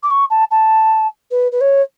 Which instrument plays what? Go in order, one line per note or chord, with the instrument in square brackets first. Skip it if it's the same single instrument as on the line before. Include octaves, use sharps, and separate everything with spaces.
[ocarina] D6
C#6
A5
A5
B4
B4
C#5